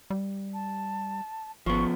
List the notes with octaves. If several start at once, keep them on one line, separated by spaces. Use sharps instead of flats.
G3
A5
G#1 F3 B3 C#6